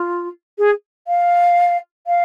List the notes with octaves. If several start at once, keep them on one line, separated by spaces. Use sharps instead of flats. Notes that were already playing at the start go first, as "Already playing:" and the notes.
Already playing: F4
G#4
F5
F5